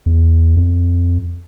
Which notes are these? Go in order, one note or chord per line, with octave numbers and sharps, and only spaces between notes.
E2
F2